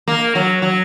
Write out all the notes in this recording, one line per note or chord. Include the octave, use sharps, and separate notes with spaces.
A#3
F#3
F#3